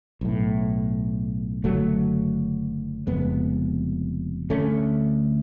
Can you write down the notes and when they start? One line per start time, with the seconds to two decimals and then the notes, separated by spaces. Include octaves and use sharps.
0.21 B1 A2
1.64 F#1 F#2 D3 F#3 A3
3.07 F1 F2 C#3 G#3 B3
4.50 D2 D3 A3 C#4